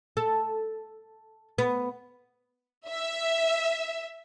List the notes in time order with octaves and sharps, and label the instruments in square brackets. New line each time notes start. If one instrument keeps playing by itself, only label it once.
[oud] A4
B3
[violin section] E5